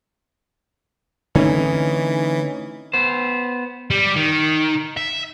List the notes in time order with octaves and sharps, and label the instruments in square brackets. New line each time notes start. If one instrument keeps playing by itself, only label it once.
[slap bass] D3 A3 C4 [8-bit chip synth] E3 [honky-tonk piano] C#4 D#4
[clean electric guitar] B3 C5
[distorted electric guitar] G3
D#3
E5